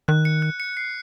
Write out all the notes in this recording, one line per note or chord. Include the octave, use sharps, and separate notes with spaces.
D#3 F#6
C#7
F#6
C#7
C7